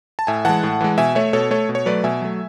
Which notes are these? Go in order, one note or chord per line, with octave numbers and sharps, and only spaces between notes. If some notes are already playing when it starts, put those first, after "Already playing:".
A5
A2 E5 G#5
E3 G#3 F#5 A5
A2
E3 G#3
B2 E5 G#5
A3 C#5 E5
B2 A4 C#5
A3 A4 C#5
B2
C#5
F#3 A3 B4 D5
B2 E5 G#5
F#3 A3